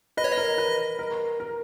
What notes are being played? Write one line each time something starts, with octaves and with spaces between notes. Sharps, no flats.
B4 D#5
C#5
D#5
A#4
B4
A#4
A#4